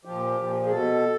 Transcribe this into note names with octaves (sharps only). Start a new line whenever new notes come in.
A#2 F3 G4
A#2 F3
G#4
B2 A4